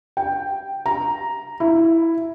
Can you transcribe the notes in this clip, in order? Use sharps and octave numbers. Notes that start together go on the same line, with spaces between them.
G5
A#5
E4